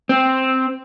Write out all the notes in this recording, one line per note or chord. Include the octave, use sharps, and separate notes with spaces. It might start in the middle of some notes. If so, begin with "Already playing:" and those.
C4